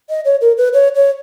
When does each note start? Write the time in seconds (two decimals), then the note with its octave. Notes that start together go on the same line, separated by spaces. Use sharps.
0.09 D#5
0.25 C#5
0.41 A#4
0.57 B4
0.73 C#5
0.95 C#5